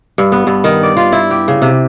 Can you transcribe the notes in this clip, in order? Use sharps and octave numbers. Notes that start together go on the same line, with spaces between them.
G2
B3
G2
D#3
D5
F4
E4
G4
C#3
C3